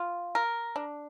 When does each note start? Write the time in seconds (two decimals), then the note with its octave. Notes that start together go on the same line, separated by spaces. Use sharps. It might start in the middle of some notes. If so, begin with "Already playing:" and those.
Already playing: F4
0.35 A#4
0.76 D4